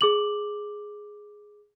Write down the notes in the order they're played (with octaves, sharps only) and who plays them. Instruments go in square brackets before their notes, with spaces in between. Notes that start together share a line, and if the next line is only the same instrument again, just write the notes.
[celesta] G#4 D6 F#7